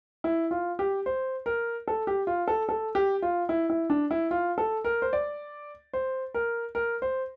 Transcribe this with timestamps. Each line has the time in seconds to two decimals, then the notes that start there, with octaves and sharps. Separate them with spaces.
0.24 E4
0.51 F4
0.79 G4
1.06 C5
1.46 A#4
1.88 A4
2.07 G4
2.27 F4
2.48 A4
2.69 A4
2.95 G4
3.22 F4
3.49 E4
3.70 E4
3.90 D4
4.11 E4
4.31 F4
4.58 A4
4.85 A#4
5.02 C5
5.13 D5
5.93 C5
6.34 A#4
6.75 A#4
7.02 C5